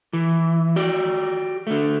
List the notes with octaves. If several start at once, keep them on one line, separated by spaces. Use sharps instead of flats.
E3
F#4 G4 D5
D3 A3